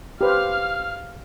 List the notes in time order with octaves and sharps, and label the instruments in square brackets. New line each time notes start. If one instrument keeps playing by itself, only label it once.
[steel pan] G4 B4 C5 [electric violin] F5 F6